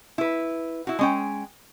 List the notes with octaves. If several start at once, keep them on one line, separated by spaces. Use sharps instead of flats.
E4 B4
E4 F#4
G#3 C#4 G5